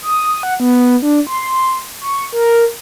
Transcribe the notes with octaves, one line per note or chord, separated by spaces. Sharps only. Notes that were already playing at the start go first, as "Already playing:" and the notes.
D#6
F#5
B3
D4
C6
C#6
A#4